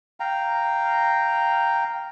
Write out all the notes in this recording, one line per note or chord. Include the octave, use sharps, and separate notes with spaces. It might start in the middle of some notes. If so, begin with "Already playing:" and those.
F5 G5 A#5